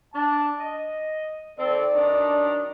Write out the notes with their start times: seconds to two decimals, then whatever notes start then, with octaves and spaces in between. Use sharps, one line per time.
0.14 D4 A5
0.59 D#5
1.59 D#3 C4 A4 D5
1.95 F#2 D#3 D4